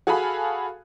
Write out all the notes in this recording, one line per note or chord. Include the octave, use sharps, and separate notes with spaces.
F#4 G#4 A4 F5 G#5 B5